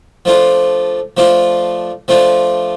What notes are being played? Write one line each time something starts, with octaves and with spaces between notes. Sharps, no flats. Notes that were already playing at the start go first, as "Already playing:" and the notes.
F3 A3 D4 F4
F3 A3 D4 F4
F3 A3 D4 F4